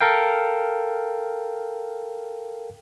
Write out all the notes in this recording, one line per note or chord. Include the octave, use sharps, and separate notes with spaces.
A4 A#4 F5 G5